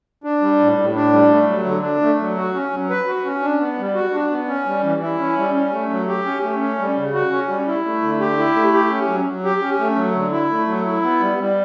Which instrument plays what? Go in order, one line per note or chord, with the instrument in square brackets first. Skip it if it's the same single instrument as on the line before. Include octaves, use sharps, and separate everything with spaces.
[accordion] D4
G3
A2
A2
D4
G3
A3
F#3
D3
D4
A3
F#3
F#4
C#4
F#3
B4
F#4
C#4
D4
B3
G3
F#4
D4
B3
C#4
G3
E3
E4
C#4
G3
C#4
A3
F#3
G4
C#4
A3
C#4
G3
C#3
F#4
C#4
G3
E4
A3
D3
G4
E4
A3
G4
C#4
F#3
F#3
G4
C#4
A3
F#3
D3
E4
A3
F#3
E4
B3
G3
G3